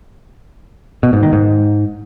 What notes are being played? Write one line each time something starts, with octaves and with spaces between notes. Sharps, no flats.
B2
G#2
D#3
G#2